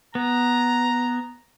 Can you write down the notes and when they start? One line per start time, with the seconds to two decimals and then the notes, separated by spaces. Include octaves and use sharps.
0.15 B3 A#5